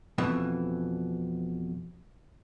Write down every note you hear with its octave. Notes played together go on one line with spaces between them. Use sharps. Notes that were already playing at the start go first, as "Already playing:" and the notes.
F2 B2 E3